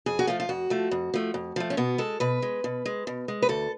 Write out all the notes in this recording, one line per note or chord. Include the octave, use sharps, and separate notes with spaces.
F2 G#4
F#4
F3 A3 F4
F4
F2 F#4
F3 A3
F2
F3 A3
F2
F3 A3
C#4
B2 B3
G#3 A4
B2 B4
G#3
B2
G#3
B2
G#3
B4
D2 A4